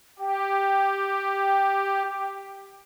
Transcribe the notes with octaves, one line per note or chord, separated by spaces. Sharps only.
G4 G5